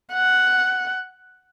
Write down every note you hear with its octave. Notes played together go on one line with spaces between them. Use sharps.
F#5